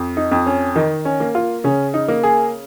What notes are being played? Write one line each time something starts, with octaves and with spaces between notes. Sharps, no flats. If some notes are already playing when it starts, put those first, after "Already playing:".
Already playing: F2
D#4
F2
C#4
D#3 D#4
C#4
A#3
F4
C#3 C#4
D#4
A#3
G#4